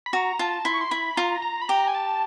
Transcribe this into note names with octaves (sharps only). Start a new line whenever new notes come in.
B5
F#4 A#5
F4 A5
E4 C6
C#6
C6
E4 B5
F4 A#5
A#5
B5
G4 A#5
G#5
A5